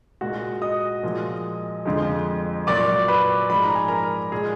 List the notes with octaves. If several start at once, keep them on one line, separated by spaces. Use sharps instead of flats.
A#2 G#3 F#4 F#5
D#5 D#6
A#2 F3 G#3
F2 D3 F3 G#3
A#2 F#3 D5 D6
B4 B5
G#2 F3 G#3 B5
A#5
G#5
A#4 A#5
A#2 G#3 G#4 G#5